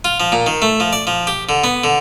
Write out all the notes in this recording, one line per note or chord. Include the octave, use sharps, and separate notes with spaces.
F4
F3
A#2
D#3
A3
F3
D5
F3
G4
D3
B3
D3